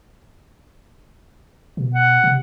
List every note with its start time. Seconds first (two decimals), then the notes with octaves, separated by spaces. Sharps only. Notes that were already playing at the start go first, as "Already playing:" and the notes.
1.77 B2
1.94 F#5
2.24 C3